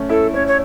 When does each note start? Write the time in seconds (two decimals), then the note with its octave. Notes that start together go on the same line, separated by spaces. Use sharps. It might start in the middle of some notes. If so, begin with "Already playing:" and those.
Already playing: A3 C#4
0.09 E4 A4
0.34 C#4 C#5
0.47 C#5